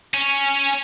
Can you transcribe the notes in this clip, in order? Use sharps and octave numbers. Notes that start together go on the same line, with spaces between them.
C#4